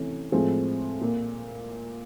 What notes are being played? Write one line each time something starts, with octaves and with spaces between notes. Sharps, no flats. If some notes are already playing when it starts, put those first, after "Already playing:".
Already playing: C3 E3 A3 C#4
A2 F3 G#3 C4
A#2